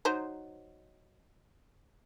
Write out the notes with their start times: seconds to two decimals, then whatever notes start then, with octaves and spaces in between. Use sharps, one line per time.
0.05 F#3 D#4 C5